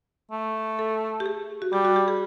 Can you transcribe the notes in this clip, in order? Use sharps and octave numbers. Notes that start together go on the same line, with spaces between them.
A3
A4
G4
G#4
F#4
G3 G4
F#4
G4
G#4